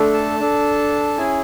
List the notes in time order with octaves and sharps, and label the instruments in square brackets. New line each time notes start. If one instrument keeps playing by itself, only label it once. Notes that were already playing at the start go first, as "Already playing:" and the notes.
Already playing: [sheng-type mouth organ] A3 D4 A4
A5
D4 A4
C#4 E4 G#4 G#5